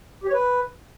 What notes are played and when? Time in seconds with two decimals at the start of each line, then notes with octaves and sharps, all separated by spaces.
0.24 G4
0.29 C#5
0.34 B4